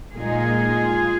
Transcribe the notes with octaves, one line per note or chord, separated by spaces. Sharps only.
A#2 G#3 D#4 F4 G#4